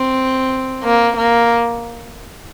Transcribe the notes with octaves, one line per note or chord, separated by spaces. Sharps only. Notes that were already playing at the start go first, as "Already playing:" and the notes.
Already playing: C4
A#3
A#3